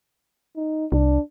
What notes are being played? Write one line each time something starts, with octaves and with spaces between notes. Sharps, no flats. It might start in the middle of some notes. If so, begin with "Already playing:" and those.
D#4
C2 D4